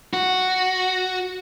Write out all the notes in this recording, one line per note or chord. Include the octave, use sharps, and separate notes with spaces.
F#4